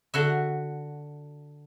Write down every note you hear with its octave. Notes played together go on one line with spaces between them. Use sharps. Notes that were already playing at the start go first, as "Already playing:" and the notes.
D3 F#4 E5